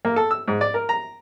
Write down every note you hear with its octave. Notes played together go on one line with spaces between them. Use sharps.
A#3
A4
E6
G#2
D5
A#4
A#5